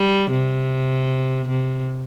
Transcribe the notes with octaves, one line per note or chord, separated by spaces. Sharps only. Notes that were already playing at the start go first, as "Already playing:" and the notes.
Already playing: G3
C3
C3